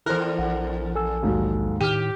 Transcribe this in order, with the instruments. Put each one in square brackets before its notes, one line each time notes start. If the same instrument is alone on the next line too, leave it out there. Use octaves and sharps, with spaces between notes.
[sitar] E2 A#4 [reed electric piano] E4 A4 C5 [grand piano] F#6
[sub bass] A#1 [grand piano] F#5
[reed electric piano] A4 G#5 E6
[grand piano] D#2 G#2 F#3
[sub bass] A2 [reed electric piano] D#3 [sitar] G4 [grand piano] F6 D#7